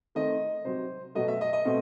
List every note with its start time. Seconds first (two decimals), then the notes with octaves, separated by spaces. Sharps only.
0.15 D#3 A3 C4 D#5
0.65 C3 F#3 C4 C5
1.15 B2 F#3 A3 D#5
1.28 E5
1.41 D#5
1.53 D#5
1.65 B2 A3 C4